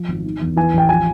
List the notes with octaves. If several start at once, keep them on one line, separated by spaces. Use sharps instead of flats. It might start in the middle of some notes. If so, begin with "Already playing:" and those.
Already playing: F3
G#1
D#3
E2
E3 G#5
A1 G5
F3 G#5